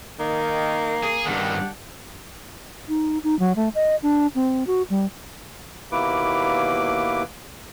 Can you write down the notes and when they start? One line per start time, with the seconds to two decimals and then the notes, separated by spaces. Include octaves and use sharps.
0.20 D#3 A#3
1.03 G#4
1.26 G2 D#3 D4 G4 F#5
2.88 D#4
3.24 D#4
3.39 F#3
3.56 A3
3.75 D#5
4.03 D4
4.35 C4
4.67 F#4
4.90 G3
5.92 D#2 B2 A#3 E4 B4 D6